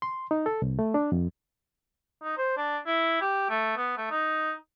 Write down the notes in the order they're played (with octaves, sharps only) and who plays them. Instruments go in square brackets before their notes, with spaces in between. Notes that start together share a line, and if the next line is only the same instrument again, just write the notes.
[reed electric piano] C6
D#4
A4
C2
A3
D4
F2
[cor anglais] D#4
C5
D4
E4
G4
A3
B3
A3
D#4